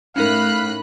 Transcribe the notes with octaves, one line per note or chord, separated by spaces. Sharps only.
A2 C#4 D#4 A#4 F5 B5 F#6